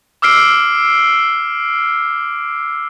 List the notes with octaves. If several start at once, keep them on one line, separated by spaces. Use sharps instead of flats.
D6 E6 F6 C7 D7